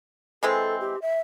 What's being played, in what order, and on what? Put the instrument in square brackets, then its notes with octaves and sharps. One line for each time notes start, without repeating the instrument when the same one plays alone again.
[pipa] E3 G#3 C4 [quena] A4
[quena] G4
E5